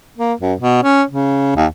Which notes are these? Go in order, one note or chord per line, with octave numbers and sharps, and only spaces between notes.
A#3
F#2
B2
C#4
C#3
D#2